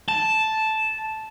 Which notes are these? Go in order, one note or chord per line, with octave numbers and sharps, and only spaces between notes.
A5